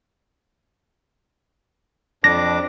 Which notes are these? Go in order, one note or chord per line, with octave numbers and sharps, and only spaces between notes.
F2 D4 D6 A#6